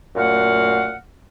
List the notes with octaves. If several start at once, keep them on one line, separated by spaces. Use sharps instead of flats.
F#2 A#2 A3 F5 F#5